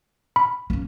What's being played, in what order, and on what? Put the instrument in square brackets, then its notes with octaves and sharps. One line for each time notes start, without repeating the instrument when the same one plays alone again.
[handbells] B5
[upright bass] A#3 C#4